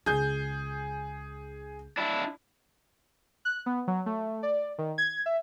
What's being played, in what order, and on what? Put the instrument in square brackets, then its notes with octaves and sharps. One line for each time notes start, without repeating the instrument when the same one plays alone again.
[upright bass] C#2 C#4 [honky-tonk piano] G#4 G6
[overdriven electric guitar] D4 E4
[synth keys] F#6
B3
F#3
A3
D5
D#3
G#6
E5